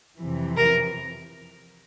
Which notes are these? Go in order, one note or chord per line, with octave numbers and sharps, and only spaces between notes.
F2 C3 E3
A#4